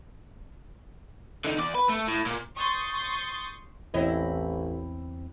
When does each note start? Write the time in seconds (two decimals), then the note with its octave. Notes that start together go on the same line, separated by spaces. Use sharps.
1.45 D3 D#4
1.58 E2 D5
1.75 B4
1.89 A3
2.08 A2
2.26 A#2
2.56 C6 C#6 D#6 G6 A6
3.94 A1 E2 C4 E4 C#5 D#5